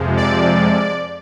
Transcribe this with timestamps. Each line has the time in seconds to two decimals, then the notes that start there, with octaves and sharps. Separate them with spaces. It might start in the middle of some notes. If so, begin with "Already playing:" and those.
Already playing: F2 C3 F3 G#3
0.17 D5